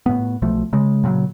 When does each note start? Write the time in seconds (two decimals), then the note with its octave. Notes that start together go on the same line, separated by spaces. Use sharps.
0.06 A2 B3
0.42 B1 B2 F3 A3
0.73 C#3 G#3
1.03 A#2 C#3 F3 F#3